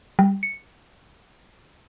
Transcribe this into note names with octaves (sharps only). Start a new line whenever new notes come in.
G3
C#7